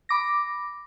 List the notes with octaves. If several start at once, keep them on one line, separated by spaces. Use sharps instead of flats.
B5 D6 A#6